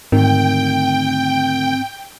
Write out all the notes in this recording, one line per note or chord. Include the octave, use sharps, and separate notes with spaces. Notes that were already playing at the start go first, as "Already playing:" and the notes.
D2 G#2 D#3 C4 G5